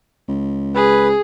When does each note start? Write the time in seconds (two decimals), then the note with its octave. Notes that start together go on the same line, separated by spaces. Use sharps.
0.28 C#2
0.75 G#4 B4